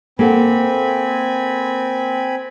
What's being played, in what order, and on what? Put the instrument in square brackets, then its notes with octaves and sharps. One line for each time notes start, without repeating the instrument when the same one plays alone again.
[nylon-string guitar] A#3 A4 F#5 [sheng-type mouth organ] C4 G#5 B5